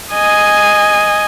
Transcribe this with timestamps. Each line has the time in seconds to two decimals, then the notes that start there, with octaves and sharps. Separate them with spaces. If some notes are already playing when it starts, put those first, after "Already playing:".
0.13 D#5 G#5